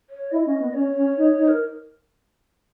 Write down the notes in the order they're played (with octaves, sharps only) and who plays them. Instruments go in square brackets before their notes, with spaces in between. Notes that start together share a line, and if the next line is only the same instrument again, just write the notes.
[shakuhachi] C#5
[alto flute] E4 [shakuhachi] D#5
[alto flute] C#4
B3
[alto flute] C#4 [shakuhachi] C#5
[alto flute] C#4
D#4
D#4
[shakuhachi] A#4